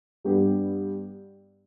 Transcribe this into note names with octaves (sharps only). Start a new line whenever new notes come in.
G2 G3 B3 G4